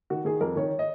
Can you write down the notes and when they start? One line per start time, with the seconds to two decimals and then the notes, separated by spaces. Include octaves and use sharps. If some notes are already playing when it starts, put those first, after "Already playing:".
0.10 D#3 F#4
0.25 D#3 G#4
0.40 F2 A#4
0.56 D#3 C#5
0.79 D#5